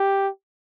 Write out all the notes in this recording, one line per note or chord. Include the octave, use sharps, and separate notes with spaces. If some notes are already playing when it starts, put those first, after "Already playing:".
Already playing: G4